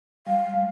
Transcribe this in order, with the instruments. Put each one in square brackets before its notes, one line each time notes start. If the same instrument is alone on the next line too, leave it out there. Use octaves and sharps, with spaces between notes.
[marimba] G3 [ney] F5
[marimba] G#3